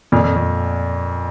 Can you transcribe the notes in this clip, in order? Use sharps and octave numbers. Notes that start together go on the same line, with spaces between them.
F2 A#2
F2
F2